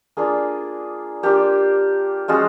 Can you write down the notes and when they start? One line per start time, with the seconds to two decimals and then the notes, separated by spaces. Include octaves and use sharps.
0.17 A#3 D4 F4 G#4
1.23 A#3 D4 F4 G4
2.28 F3 G#3 C#4 F4 F#4